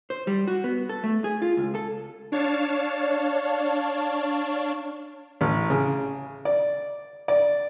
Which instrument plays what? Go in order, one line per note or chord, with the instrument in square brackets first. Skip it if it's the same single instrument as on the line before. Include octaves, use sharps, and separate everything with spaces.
[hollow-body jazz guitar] C5
G3
F#4
B3
A4
A3
G#4
F4
C#2
A4
[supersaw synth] D4 C#5 F5 A5
[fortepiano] A1
C#3
D5
D5